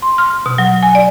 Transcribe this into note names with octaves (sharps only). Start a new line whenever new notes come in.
C6
F6
B2
F#3
G#5
D5